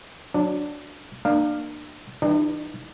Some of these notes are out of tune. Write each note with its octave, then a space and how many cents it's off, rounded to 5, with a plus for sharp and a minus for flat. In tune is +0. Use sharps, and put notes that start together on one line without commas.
F#3 -15 D4 +0
A#3 +0 D4 +35 F5 +0
E3 -15 G3 +20 D4 +45